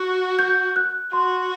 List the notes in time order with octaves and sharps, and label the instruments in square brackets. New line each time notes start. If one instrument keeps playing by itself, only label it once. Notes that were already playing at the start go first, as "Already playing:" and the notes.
Already playing: [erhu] F#4
[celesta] G6
F#6
[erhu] F#4 [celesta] C6